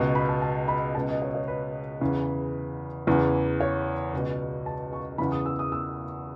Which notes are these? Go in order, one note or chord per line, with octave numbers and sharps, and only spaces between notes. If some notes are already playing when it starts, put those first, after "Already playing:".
Already playing: C#2 B2
B5
A5
A5
B5
C#2 B2 A5
D#5
C#5
C#5
B4
E2 C#3 E3
E2 C#3 E3
C#5
C#2 B2
A5
C#6
E2 C#3 E3 B5
D#6
E6
D#6
E6